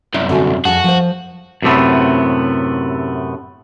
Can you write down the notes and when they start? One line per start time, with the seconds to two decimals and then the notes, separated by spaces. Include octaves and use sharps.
0.14 C2 F#2 E4
0.29 D3 F#4 G#5
0.65 F2 F#4 G#4 A5
0.84 F3 C5
1.62 F#2 A2 C3 A3 B3